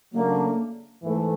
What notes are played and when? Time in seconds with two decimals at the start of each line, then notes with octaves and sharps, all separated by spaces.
0.13 C#3 F#3 A3 A#3 D4
1.03 G#2 E3 A3